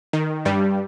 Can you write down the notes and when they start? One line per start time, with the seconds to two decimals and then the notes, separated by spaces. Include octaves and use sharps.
0.13 D#3
0.45 G2 G3